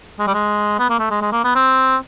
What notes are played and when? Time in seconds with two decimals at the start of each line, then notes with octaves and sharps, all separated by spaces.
0.19 G#3
0.27 G3
0.34 G#3
0.79 B3
0.89 A#3
0.99 A3
1.11 G#3
1.21 G#3
1.32 A#3
1.44 B3
1.55 C4